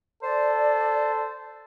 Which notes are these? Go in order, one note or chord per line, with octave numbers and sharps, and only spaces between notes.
A4 C5 D5